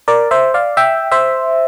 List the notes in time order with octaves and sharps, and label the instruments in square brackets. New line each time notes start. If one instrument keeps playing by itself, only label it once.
[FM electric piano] A#4 D5
C5 E5
D5 F5
E5 G5
C5 E5